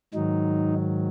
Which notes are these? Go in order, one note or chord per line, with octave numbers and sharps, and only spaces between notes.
G#2 D#3 F#3 D#4